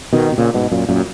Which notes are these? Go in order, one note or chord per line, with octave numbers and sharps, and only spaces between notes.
B2 D#3
B2
A#2 C#3
G#2 B2
F#2 A#2
F#2 A#2